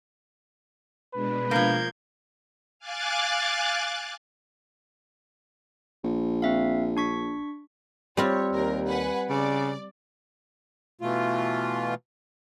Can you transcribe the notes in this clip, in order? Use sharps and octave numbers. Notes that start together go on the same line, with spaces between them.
B2 G#3 D4 B4
F3 A#3 G6 G#6
F5 G#5 D6 F#6 A6
A#1
C4 E5 F5
D4 C#6 B6
G3 C4 F4 C#5
D#2 A#4
B4 F#5 G#5
C#3 D5
B2 E3 A3 F4